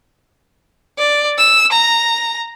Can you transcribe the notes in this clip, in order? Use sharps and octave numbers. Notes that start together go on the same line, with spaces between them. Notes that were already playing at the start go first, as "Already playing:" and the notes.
D5
E6
A#5